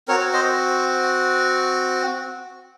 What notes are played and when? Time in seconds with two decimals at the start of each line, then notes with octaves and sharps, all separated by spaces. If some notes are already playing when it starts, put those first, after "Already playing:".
0.08 C4 F#4 A#4 C#5
0.33 C5 D#5